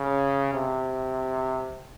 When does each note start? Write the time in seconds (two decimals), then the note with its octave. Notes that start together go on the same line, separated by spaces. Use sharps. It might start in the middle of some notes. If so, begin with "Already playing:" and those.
Already playing: C#3
0.53 C3